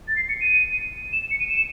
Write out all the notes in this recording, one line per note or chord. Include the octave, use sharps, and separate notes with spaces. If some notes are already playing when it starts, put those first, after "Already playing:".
A6
C7
C#7
D#7
E7
C#7
D#7
E7